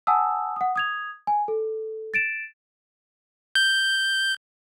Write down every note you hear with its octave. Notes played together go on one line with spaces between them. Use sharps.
F#5 G#5 A5 D#6 E6
F#5 D#6
D#6 G#6 F7
G#5
A4
A6 D7 E7
G6